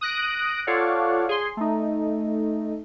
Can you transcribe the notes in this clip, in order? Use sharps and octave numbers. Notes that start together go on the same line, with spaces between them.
D#6 F#6 A#6 D7
F4 A4 C#5 D5 F5 F#5
G#4 C6
A3 D#4